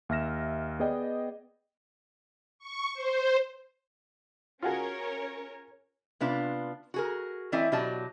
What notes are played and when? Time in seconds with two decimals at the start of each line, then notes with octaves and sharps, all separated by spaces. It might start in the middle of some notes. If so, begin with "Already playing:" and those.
0.09 D#2 E5 F6 A#6 E7
0.80 B3 G#4 D5 D#5 G5
2.59 C#6
2.94 C5
4.63 C#4 F4 F#4 G#4 A#4 C#5
6.20 C3 B3 D4 F4
6.94 F#4 G#4 A#4
7.52 E3 A3 C4 E4 D5 D#5
7.72 B2 F#3 G4 D5 D#5 A5